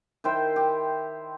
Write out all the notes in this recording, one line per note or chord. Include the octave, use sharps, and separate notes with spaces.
D#3 E4 C5 G5
G4